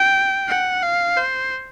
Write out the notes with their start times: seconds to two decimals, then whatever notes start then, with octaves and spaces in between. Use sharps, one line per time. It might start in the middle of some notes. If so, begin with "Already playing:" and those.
Already playing: G5
0.49 F#5
0.83 F5
1.17 C5